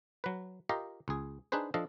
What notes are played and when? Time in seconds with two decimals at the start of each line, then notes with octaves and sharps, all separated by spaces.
0.24 F#3 B4
0.69 F4 G4 A#4 D#5 F5
1.08 C#2 G#4
1.52 D4 D#4 G#4 B4 C5
1.74 F3 D4 A4 D#5 F5